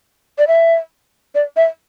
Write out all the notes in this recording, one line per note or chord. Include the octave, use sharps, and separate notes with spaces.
D5
E5
D5
E5